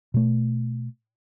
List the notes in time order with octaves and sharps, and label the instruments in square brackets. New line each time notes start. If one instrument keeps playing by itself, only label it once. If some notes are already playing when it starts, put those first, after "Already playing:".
[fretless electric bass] B2 A3